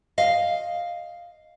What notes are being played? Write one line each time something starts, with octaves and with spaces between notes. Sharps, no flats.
D#5 F5